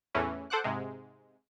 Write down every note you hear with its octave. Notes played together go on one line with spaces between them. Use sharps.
E2 A2 E3 C#4
A4 C5 F#5 D6 F#6
G#2 C3 G#3